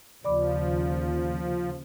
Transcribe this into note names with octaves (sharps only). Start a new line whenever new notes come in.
D#2 C#3 F3 D5 B5 D6